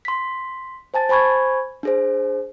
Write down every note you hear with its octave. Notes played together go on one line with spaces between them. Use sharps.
C6 B6
C5 G#5 A5 A6
C5 G#5 B5 C#6 G#6
D4 G#4 C5